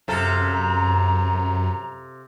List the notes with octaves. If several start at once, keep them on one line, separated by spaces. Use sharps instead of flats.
F#2 C3 F4 A4 A#5